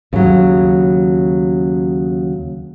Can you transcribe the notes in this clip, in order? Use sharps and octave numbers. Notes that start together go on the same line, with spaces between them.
D#2 C#3 F#3